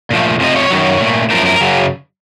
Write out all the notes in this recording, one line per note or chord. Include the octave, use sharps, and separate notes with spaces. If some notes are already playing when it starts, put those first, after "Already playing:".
A#2 F3 A3
F2 C3 F3 A3 D#5
C#5
F#2 D#3 F#3
A#2 A3
F#2 F3 A3 A#4
A#4
F#2 C#3 F#3